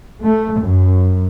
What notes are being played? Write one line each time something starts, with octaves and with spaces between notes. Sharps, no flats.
A3
F#2